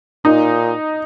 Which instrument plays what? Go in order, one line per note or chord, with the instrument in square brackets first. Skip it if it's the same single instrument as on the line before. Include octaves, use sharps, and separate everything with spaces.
[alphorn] A#2 [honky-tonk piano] D#4